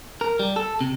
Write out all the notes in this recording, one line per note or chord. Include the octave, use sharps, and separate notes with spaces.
A#4
G3
A4
C3